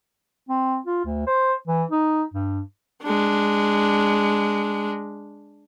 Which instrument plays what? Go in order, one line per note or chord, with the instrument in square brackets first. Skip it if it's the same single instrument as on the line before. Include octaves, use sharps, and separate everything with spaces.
[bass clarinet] C4
F4
D2
C5
E3
D#4
G2
[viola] G#3 D4